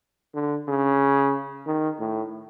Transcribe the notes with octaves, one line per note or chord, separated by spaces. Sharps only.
D3
C#3
D#3
A2